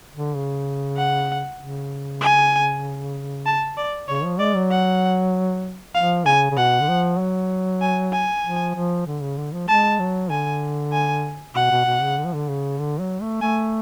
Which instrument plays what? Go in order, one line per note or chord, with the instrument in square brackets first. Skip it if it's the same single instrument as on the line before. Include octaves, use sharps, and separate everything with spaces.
[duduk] D3
C#3
[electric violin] F#5
[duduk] C#3
[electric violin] G#5
A5
D5
[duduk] C#3 [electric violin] C#5
[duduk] F3
[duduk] G#3 [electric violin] D5
[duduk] F#3
[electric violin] F#5
[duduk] F3 [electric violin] F5
[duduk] C#3 [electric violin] G#5
[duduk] C#3
[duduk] B2 [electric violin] F#5
[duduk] D3
F3
F#3
[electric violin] G#5
G#5
[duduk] F3
F3
D3
C#3
D3
F3
[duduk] G#3 [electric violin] A5
[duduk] F#3
[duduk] D3 [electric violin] G#5
[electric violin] G#5
[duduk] B2 [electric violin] F#5
[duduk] B2
B2
C#3
D3
F3
D3
C#3
D3
F#3
A3
[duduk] A3 [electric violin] G#5